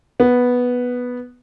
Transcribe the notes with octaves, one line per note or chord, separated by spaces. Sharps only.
B3